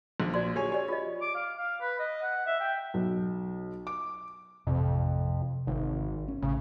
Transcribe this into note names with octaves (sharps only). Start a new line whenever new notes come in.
A#1
F#4 D5 C6
F#4 G#4 C#5 G#5
G4 C#5 D5
F4 D#5
D6
F5
F5
B4
D#5
F#5
E5
G5
B1
D6
A1 F2 C3
G#1 D#3
C#4
A1 C#3